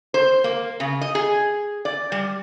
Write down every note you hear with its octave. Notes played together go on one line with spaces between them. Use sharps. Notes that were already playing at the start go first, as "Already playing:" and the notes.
C5
A#3
C#3
D#5
G#4
D5
G3